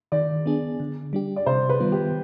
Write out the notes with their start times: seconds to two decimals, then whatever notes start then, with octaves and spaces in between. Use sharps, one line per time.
0.12 D#3 D5
0.46 B3 D4 G#4
0.80 D3
1.13 G3 D4 G4
1.36 D5
1.46 C3 C5
1.69 B4
1.80 D#3 G3 B3 F4
1.92 G4